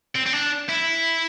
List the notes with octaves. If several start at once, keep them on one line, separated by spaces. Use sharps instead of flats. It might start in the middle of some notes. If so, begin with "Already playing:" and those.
C4
C4
D4
E4